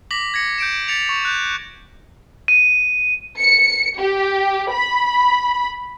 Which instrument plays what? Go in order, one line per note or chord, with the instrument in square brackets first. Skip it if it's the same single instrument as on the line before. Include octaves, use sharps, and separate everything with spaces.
[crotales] D6 A#6 B6 F#7
G#6 A#6 C#7
G6 D7 E7
A6 B6 C#7 F7
C#6
F#6 G6
D#7
[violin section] C#7
G4
B5